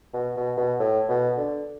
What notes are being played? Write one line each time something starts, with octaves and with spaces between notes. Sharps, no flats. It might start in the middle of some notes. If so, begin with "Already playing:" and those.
B2
B2
B2
A2
B2
D3